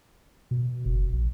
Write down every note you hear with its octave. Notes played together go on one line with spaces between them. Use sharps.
B2
F#1
A#1